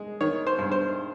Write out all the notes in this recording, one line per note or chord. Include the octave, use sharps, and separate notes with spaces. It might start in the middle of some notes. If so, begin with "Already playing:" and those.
Already playing: G#3
D#3 C#5
C5
G2
C5